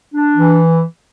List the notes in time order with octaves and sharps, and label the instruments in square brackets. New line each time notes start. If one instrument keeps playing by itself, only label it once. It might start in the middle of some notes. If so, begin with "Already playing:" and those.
[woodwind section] D4
E3